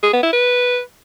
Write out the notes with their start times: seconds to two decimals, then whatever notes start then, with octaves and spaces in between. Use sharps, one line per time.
0.03 G#4
0.13 B3
0.23 E4
0.33 B4